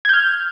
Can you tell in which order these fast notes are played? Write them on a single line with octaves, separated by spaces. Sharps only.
G#6 G6 F6